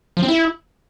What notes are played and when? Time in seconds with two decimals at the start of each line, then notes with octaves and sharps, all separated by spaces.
0.17 F3
0.23 C4
0.28 E4